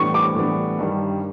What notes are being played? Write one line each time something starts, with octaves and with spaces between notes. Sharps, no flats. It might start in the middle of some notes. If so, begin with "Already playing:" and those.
Already playing: A2 E3 G3 B3 D4 C#6
D6
A2 E3 G3 B3 D4
G2 D#3 G3